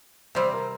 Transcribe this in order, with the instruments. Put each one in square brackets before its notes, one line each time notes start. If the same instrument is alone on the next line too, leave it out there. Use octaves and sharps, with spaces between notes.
[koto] C3 G3 C4 [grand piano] C5
[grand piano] A#4